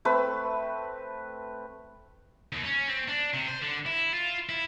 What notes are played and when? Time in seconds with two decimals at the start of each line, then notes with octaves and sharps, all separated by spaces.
0.05 A3 C4 B4
2.53 D#2
2.65 C#4
2.89 C4
3.08 D4
3.34 C3
3.48 C5
3.62 D3
3.86 E4
4.13 F4
4.49 E4